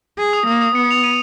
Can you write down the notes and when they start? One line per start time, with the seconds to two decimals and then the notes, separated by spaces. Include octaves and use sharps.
0.18 G#4
0.33 D#6
0.47 A#3 D#6
0.62 D#6
0.75 B3 C#7
0.91 F7
1.04 D#7